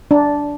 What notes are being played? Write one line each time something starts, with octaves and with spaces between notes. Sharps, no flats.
D4